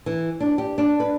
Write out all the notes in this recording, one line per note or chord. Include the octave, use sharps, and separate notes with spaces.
E3
D4
G4
D4
B4